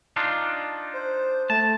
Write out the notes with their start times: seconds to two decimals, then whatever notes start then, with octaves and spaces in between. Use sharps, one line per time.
0.16 D4 D#4 F4
0.93 C5
1.50 A3 A5